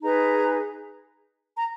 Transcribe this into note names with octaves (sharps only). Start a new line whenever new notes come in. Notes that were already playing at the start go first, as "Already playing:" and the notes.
D#4 G#4 B4 A#5
A#5